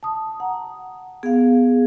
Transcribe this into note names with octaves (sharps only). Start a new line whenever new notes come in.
A5 D#6
F#5 A#5
B3 G#4 F5